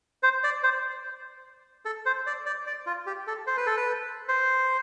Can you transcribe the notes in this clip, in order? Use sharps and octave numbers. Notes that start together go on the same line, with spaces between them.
C5
D5
C5
A4
C5
D5
D5
D5
F4
G4
A4
C5
B4
A4
B4
C5